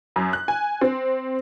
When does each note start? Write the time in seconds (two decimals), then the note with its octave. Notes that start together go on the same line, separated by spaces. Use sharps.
0.16 F#2
0.33 F#6
0.48 G#5
0.81 C4